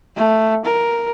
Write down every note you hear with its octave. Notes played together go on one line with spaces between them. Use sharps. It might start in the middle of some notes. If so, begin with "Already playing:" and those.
A3
A#4